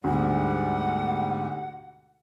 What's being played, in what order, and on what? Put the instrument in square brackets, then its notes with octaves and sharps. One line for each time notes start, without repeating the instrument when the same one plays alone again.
[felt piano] D2 B2 D3 [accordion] G#2 G3 [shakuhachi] F#5